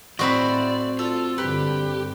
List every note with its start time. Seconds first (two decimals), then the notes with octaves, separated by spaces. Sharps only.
0.19 A2 C4 E4 F#4 D5 D#5
0.99 F4 A4
1.38 G2 D3 G4 B4